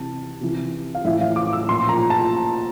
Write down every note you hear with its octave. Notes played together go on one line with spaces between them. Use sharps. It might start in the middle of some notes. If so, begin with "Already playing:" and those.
Already playing: C3 E3 A5
C3 E3
F5
A2 E3 E5
F5
D6
E6
A#2 F3 C6
A#5
A5